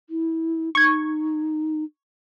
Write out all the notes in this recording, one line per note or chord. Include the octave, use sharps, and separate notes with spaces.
E4
D#4 C#6 G#6